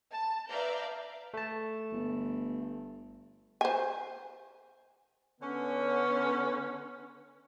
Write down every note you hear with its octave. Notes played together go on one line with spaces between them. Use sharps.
A5
B4 D5 E5 F5 A#5 G6
A3 A5
G1
C5 G#5
D3 B3 C#4